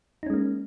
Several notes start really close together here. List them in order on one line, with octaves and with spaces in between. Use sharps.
D#4 C#4 G#3 A#3